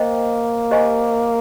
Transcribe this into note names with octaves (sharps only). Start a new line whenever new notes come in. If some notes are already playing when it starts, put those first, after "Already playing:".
Already playing: A#3 C5 D#5 G5
G4 C5 D#5 G#5 C#6